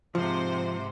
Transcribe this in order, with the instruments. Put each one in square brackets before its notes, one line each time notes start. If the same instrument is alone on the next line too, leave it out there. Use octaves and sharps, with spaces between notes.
[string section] G#2 C3 C5 [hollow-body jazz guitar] F3